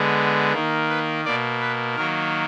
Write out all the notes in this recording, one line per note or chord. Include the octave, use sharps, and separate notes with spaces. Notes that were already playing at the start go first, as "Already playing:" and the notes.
Already playing: D3 G#3 B3
D#3 A#3
B4
B2 A#3 D5
B4
D#3 F#3 A#3 A#4